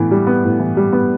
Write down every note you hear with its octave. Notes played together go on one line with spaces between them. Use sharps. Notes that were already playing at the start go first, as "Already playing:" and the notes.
Already playing: A2 E3 B3
G3
B3
A2
E3
G3
B3